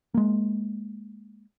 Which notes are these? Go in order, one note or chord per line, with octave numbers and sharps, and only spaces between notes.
G#3 A#3